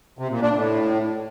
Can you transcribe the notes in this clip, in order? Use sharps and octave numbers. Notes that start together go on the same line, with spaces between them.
C3
A#2
D4
A2